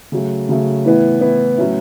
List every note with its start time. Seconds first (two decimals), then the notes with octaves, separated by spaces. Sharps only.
0.12 C#3 F#3 A3
0.49 C#3 F#3 A3
0.85 A2 E3 B3 E4
1.21 A2 E3 B3 E4
1.58 A2 F#3 C#4 E4